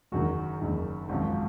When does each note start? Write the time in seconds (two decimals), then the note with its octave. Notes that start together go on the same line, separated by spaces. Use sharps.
0.12 F#1 F#2 D#3 F#4
0.61 F#1 F#2 D#3
1.09 G#1 F#2 F3 F#4